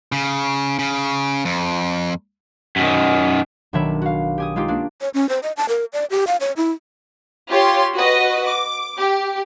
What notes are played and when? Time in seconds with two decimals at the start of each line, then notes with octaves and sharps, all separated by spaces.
0.12 C#3
0.79 C#3
1.45 F2
2.76 F#2 D#3
3.73 B1 D#3 D4 C#5 E5 B5
4.02 F#4 F5
4.38 G4 G#5 D#6
4.56 G#3 D#4 F4 G4
4.68 A#3 C#4 D4
5.01 C#5
5.14 C#4
5.29 C5
5.43 D#5
5.57 A5
5.69 A#4
5.93 D5
6.10 G4
6.27 F5
6.41 C#5
6.57 E4
7.49 F4 G4 C#5 C6
7.95 F#4 B4 D#5
8.45 D6
8.98 G4